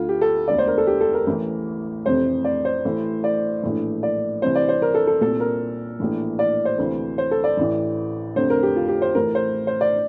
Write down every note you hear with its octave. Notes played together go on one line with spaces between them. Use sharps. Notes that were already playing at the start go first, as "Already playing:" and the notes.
Already playing: D2 D3 F4
G4
A4
E1 D2 D3 D5
C5
A#4
A4
G4
A4
A#4
A1 A2 E3
F1 F2 C3 E3 C5
D5
C5
A1 A2 E3
D5
A#1 A2 E3
D5
C2 C3 E3 C5
D5
C5
A#4
A4
A4
C2 A#2 A4
A#4
A#1 A2 E3
D5
C5
D2 C3 E3
C5
A4
D5
A1 A2 E3
F1 F2 D3 C5
A#4
G4
F4
G4
C5
A1 A2 E3 A#4
C5
C5
D5